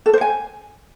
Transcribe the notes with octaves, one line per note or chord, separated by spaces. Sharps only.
A4
C5
G#5